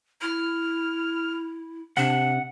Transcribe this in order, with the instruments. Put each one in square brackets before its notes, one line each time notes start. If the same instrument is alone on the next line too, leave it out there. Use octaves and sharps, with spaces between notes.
[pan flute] E4 [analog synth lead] F6
[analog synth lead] C3 [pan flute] D4 [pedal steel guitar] F#5